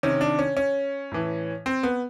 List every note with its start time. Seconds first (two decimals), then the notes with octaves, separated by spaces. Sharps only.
0.03 C3 D#3 C#4
0.21 D4
0.39 C#4
0.57 C#4
1.12 A2 E3
1.66 C4
1.83 B3